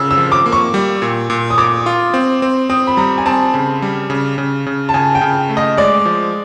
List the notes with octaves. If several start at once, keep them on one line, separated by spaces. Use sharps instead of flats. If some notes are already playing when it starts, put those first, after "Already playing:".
Already playing: C#3 E6
E6
F3
D6
A#3
C#6
G3
A#2
A#2
D#6
A#2 D6
F4
C4
C4
C4 D#6
B5
G3 A#5
G#5
C4 A5
C#3
G3
C#3
C#3
C#3
A5
C#3 G#5
G5
C#3
A3
D#5
G#3 D5
F3